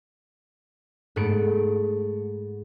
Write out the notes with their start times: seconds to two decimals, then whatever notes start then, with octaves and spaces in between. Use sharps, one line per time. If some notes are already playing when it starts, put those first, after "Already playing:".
1.16 G#2 A3 B3 C#7 D7